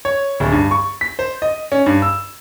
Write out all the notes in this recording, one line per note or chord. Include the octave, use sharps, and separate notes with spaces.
C#5
D1
G2
C#6
B6
C5
D#5
C#4
G2
E6